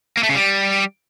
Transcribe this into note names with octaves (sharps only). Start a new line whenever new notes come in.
A#3
A3
C#3
G3